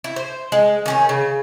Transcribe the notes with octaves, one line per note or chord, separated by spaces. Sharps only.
E4
C5
G#3
D#3 C#4 G#4
C#3